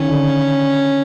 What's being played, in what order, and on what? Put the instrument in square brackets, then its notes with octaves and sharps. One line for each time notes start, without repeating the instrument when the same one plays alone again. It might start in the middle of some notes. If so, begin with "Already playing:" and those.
Already playing: [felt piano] D#3 [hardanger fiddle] C#4
[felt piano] D3